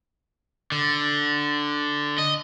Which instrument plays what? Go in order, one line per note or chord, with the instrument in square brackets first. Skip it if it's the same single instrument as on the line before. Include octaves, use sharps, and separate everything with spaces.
[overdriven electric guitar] D3
D#5